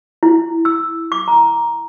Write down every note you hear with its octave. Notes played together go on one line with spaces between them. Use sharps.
E4
E6
D6
A#5